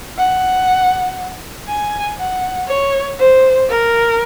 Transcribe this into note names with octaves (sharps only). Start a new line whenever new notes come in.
F#5
G#5
F#5
C#5
C5
A#4